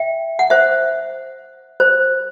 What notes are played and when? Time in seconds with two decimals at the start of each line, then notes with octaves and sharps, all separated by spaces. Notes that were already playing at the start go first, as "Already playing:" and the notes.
Already playing: E5 G5
0.39 F#5
0.50 C5 E5
1.80 C5